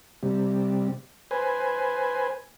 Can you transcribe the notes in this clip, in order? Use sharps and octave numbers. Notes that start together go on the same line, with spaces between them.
C3 G3
B4 C5 G#5